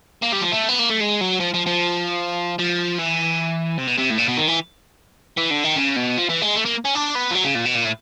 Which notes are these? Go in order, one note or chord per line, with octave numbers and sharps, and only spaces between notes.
A#3
G3
F3
A3
B3
A#3
A3
G#3
F#3
F3
F3
F3
F3
E3
C3
B2
C3
A2
A#2
B2
D#3
E3
E3
D3
D#3
C#3
B2
F3
E3
G#3
A3
A#3
C#4
D4
B3
F3
F#3
C#3
A#2
B2
A#2
A2